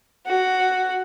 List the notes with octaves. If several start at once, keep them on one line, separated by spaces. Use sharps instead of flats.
F#4